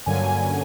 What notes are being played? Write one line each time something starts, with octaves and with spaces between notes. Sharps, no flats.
G2 D3 F#3 A#3 C#4 G#5